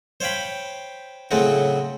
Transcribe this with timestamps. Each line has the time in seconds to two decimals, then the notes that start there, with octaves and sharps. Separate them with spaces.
0.20 C5 C#5 F5 G5 B5
1.31 A2 C#3 F#3 A3 C4 F#4